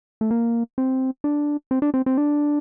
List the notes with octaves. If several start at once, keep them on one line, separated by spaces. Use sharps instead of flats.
A3
A#3
C4
D4
C4
D4
C4
C4
D4